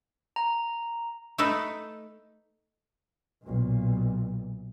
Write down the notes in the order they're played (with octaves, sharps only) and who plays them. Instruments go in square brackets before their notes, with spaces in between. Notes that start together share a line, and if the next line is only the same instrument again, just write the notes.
[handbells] A#5
[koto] A3 D#4 A4 B4
[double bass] B1 A#2